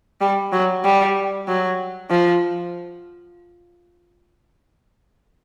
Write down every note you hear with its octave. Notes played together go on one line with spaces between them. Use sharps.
G3
F#3
G3
F#3
F3